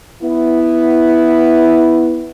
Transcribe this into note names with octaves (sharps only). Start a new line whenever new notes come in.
B3 E4